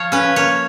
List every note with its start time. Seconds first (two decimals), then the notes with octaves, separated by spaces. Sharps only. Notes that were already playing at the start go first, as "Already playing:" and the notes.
Already playing: F3 C#5 F5
0.12 C#4 B4
0.36 A#3 C#5